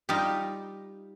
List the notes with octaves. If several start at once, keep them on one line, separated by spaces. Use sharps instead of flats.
G3 D#4 F4 G4